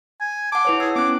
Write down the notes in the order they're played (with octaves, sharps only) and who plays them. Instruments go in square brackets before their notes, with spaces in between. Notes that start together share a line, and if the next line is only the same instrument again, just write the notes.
[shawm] G#5
[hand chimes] F#5 A5 [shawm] D6
[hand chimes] E4 B4 C#5
[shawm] G#4 [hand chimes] E6
[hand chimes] B3 C#4 F#6 [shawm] D6